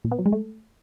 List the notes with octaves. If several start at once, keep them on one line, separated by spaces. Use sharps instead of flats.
A#2
B3
F#3
G#3
A3